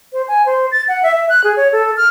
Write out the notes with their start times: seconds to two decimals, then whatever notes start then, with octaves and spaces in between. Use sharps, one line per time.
0.13 C5
0.28 G#5
0.46 C5
0.72 A6
0.88 F#5
1.03 E5
1.15 E5
1.29 F#6
1.44 G#4
1.57 C#5
1.72 A4
1.97 F6